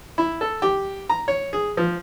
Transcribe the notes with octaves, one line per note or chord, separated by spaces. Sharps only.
E4
A4
G4
A#5
C#5
G#4
F3